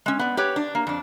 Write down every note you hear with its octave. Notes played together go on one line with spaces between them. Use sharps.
G#3 C#4
B3 D5
G4 B4 C#5
D4
A#3
F2 D4